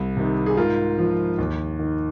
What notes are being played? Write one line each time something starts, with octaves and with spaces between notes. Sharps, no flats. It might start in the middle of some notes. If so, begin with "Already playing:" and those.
Already playing: C2
C3 D#3
G#4
G#2 F4 A#4
F3
D#2
D#3